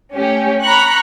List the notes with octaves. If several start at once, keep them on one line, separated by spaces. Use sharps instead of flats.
A3 C#4 G4
A#5 B5 C#6 F#6